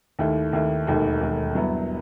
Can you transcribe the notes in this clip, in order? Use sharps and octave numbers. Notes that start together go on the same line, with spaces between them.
D#2 D#3 A3 E4
D#2 D#3 A3 E4
E1 D#2 D#3 A3
E1 D#2 D#3 A3
G2 F#3 B3 E4